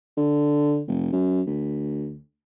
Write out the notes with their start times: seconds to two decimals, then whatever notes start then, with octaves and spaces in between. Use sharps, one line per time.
0.18 D3
0.88 F1
1.13 F#2
1.47 D2